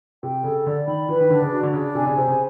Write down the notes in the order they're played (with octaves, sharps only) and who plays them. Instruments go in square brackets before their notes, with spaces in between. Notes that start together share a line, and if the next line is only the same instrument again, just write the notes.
[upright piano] C3 [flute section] G5
[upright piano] C#3 [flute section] A4
[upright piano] D3 [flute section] D5
[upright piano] D#3 [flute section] B5
[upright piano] E3 [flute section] B4
[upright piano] D#3
[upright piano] D3 [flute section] D4
[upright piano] C#3
[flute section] F#4
[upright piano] D3
[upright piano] C#3 [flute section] D4
[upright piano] C3 [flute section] G#5
[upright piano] C#3
[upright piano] C3 [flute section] C5
[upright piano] C#3